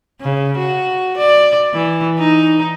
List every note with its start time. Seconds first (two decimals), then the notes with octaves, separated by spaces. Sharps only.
0.21 C#3
0.59 F#4
1.18 D5
1.74 E3
2.19 D#4